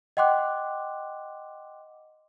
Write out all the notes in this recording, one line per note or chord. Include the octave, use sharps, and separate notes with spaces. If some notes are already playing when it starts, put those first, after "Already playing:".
D#5 F#5 G5 C6 D6 F#6